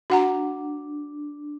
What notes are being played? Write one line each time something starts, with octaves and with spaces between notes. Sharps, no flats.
D4 F#4 F#5 A#5